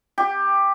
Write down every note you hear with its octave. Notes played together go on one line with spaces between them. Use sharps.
G4